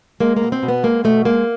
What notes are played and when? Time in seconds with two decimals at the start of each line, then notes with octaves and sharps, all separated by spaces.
0.20 G#3 A#3
0.37 B2 A#3
0.52 C4
0.63 B2
0.68 B3
0.83 G#3 A#3
1.04 B2 A3
1.25 G#3 A#3